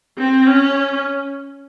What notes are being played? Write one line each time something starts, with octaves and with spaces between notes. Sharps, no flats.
C4
C#4